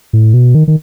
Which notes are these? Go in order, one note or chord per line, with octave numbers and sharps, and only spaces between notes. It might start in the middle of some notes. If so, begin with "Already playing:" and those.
A2
B2
D#3
D#3